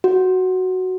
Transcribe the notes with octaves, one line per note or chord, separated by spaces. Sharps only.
F#4